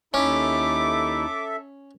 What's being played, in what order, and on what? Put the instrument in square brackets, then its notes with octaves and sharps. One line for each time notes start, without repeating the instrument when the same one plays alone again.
[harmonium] D#2 D#4 E4 [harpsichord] C#4 [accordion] A4 E5 [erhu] D6